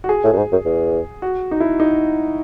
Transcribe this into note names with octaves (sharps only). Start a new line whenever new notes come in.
F#4
G#4
A2
F#2
G#2
F#2
E2
F#4
D#4
E4
D#4